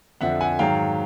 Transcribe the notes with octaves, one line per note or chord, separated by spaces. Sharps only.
F2 D3 F3 E5 F#5
F#5 G#5
G#2 D#3 F#3 F5 G5